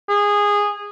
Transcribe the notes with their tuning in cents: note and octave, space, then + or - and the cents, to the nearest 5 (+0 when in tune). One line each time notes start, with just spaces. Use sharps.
G#4 -15